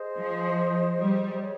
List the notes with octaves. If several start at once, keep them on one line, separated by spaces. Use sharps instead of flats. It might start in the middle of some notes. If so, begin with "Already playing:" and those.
Already playing: G#4 C5 D#5
F3
G3
G#4 C#5